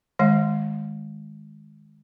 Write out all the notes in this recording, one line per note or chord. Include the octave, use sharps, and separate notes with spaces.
D#3 G#3 E5